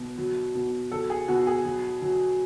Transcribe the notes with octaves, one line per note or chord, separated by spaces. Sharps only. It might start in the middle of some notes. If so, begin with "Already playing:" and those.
Already playing: B2
F#3
B2
F#3 A4
G#4
B2 F#4
G#4
F#3
F#3